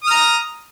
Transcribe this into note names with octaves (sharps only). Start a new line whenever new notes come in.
A#5 D#6 F6